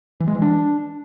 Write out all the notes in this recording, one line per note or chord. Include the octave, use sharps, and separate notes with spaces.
E3
G#3
E3
D4